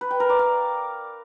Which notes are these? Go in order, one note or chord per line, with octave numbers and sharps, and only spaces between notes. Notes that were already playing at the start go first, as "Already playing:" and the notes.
B4
G5
A#4
D5
F5